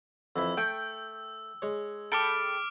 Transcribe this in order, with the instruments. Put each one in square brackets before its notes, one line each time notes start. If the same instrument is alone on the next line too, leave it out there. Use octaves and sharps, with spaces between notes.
[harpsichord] F2 E3 E4 [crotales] E6
[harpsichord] A3 C#6 [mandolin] G5
[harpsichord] G#3 C#5
[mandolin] A4 G5 B5 [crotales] D6 F6 D7